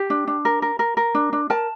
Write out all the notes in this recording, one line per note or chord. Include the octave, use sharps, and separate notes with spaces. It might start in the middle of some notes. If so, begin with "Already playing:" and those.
Already playing: G4
D4
D4
A#4
A#4
A#4
A#4
D4
D4
A#4 A5